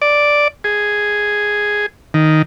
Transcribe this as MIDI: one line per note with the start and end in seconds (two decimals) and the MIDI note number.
0.02 0.48 74
0.64 1.86 68
2.14 2.42 51